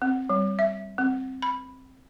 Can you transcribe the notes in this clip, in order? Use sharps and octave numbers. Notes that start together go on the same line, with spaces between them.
C4
G3
E5
C4
B5